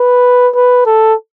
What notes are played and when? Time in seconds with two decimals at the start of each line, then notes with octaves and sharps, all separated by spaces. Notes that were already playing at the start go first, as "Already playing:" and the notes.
Already playing: B4
0.55 B4
0.86 A4